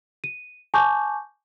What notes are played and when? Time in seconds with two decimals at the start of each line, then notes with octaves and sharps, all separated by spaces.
0.24 D#7
0.74 G#5 A5 C#6 D6 G6